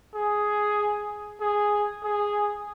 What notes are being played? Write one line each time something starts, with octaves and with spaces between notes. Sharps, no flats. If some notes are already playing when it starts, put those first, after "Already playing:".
G#4
G#4
G#4